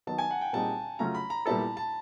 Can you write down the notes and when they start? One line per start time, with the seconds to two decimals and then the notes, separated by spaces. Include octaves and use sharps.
0.07 D#3 F#3 B3 A5
0.18 G#5
0.31 F#5
0.41 G5
0.53 A#2 G3 C4 D#4 G#4 A5
0.99 C#3 F#3 A3 C#4 F4 A#5
1.15 B5
1.30 A#5
1.46 A#2 G3 B3 E4 A4 A5
1.77 A5